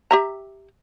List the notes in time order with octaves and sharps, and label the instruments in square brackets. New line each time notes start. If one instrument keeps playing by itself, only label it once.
[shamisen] G4 E5 A#5